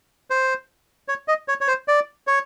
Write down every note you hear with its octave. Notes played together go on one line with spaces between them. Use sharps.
C5
C#5
D#5
C#5
C#5
C5
D5
C#5